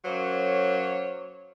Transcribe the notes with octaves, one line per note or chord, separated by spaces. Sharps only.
F#2 F#3 A#3 C5 C#5